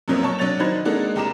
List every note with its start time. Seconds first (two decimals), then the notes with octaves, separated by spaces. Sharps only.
0.08 F#2 B2 F3 F#3 A#3
0.23 C#5 A5 C#6
0.39 F#3 D4 C#5 A6 F7
0.59 D#3 D#4 F#4 C5 B5 G#6
0.85 G#3 A#3 D4 D#4 F#4 A4
1.16 F1 G4 A#5 D6 E7